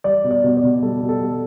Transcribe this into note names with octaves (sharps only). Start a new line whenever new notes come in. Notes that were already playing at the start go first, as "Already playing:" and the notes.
G3 D5
B2
D5
B2
D5
B2
G3 A4
B2
A4
G3